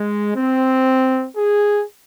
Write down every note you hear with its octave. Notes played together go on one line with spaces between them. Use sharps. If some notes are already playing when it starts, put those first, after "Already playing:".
Already playing: G#3
C4
G#4